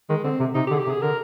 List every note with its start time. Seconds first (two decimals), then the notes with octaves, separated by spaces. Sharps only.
0.09 D#3 G#3
0.24 D3 C4
0.40 C3
0.55 C3 D#4
0.67 G4
0.71 D3
0.74 G#4
0.79 G4
0.87 C3
0.90 G#4
1.02 D3 A#4